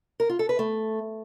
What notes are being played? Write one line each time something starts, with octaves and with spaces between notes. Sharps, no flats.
A#4
F4
A4
B4
A3